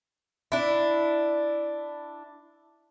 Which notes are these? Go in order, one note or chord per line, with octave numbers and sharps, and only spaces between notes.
D4 E4